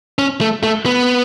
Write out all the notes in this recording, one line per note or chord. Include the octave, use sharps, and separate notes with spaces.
C#4
A3
A3
B3